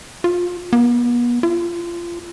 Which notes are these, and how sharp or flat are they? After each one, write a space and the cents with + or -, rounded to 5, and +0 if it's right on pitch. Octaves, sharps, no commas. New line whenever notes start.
F4 +25
B3 -40
F4 -25